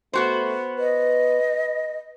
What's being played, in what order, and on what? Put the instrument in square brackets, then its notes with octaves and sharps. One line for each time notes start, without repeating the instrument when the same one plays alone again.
[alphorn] A3 [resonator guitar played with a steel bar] B3 F#4 C5
[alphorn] B4 [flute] D#5